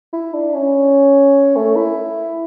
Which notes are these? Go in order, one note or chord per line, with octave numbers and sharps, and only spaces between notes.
E4
D4
C#4
A3
E4